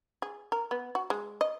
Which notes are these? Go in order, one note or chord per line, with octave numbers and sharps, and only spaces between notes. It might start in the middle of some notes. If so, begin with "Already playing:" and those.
G#4
A#4
B3
F#4
G#3
D#5